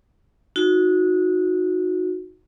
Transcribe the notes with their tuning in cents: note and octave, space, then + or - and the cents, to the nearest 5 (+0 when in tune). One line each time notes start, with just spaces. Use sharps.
D#4 +15 F#4 -20